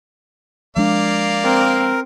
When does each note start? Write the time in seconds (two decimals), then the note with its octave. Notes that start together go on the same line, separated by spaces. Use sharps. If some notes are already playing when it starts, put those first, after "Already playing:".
0.76 F3 G#3 A#3 D4 D5 F5
1.44 C4 A#4